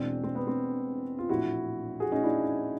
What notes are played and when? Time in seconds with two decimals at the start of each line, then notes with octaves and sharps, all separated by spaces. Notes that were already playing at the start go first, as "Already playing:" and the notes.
Already playing: E1 E2 B2 G#3 C4 D4
0.23 C4
0.35 B3
0.47 C4
1.19 F4
1.29 A#1 A2 E3 E4 F#4
2.00 F#4 G#4
2.12 C#4 D#4
2.23 D4 E4